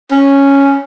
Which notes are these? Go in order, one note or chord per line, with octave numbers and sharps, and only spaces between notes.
C#4